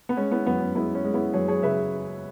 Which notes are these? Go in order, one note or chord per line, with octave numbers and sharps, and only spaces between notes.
B3
G#3 C#4
B3 E4
F#2 B3
C#4
G#3 B3 E4
C#4
G#3
B3 E4
F#2 G#4 C#5
G#4 C#5
C#3 B4 E5